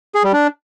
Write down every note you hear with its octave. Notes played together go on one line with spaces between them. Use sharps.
G#4
G3
D4